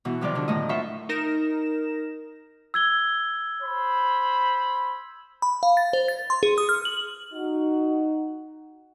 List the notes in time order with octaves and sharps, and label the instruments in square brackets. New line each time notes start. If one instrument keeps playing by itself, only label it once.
[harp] B2 E3 F#4
C3 D#3 F3 F#3 D#4 D5
D3 D4
A2 D#3 A3 D#5
F4 C5 E5 F#5 B5 C#6
[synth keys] D#4 A#4 A#6 E7
[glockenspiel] E6 G#6 G7
[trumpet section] C5 B5
[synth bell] B5
F5
A6
C5
A6
C6
G#4
D#6
F6
F#7
[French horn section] D#4 F#4